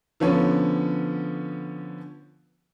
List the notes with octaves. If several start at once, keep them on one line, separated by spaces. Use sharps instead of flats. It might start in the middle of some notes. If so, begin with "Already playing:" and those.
D3 F3 B3 C#4